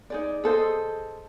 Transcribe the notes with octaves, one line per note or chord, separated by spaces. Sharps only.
D#4 G#4 D5
G#4 A4 C5 D#5